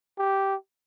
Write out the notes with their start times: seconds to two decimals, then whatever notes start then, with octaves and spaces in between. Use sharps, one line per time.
0.18 G4